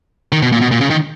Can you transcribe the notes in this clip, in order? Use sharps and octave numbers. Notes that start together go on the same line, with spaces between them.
D#3
B2
A#2
B2
A#2
C#3
D#3